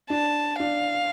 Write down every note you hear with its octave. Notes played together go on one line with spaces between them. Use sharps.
D4 A5
D4 F5